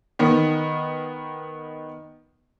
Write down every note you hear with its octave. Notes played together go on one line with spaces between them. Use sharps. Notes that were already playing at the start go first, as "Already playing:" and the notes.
D#3 B3